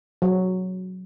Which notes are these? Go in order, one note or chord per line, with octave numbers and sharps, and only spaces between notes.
F#3